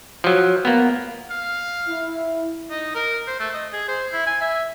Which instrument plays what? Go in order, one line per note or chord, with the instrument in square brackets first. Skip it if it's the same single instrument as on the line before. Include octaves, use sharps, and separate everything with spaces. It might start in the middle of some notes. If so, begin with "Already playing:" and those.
[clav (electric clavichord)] F3 F#3
A#3 B3
[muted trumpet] F5
[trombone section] E4
[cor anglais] D#4
A#4
C5
A3
D#5
G#4
C5
E4
G#5
E5